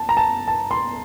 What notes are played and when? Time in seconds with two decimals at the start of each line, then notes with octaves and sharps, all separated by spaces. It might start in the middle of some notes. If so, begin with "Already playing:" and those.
Already playing: A5
0.09 A#5
0.17 A5
0.48 A5
0.71 C6